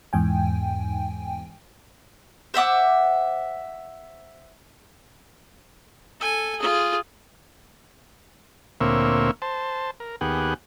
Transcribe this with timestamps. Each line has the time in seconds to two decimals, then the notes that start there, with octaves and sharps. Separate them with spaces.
0.13 E2 G#2 G5 G#5
2.54 C5 E5 F#5 D6
6.20 A4 G#5
6.59 F4 G#4
8.81 D2 A#2 A#3 C4 C#5 E5
9.42 C5 A5
10.00 A#4
10.21 D#2 B3 G4 G#4 F#5